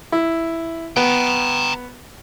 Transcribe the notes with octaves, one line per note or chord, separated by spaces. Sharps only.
E4
B3 G5 A#5